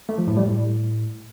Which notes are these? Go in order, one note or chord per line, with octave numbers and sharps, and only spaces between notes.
A3
F3
A2
G3
A2